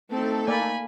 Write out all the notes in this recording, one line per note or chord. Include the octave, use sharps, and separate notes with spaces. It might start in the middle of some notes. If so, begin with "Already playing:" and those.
A3 C4 D#4 A4
A#3 D5 G#5 B5